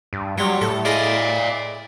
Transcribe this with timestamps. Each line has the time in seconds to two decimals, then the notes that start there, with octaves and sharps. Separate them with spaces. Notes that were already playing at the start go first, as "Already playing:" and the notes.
0.13 G2
0.38 F#3 G3 F4 C#5
0.61 A2 A4
0.85 E4 G#4 D5 D#5 F5